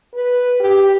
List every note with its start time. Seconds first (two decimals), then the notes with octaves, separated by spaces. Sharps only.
0.14 B4
0.60 G4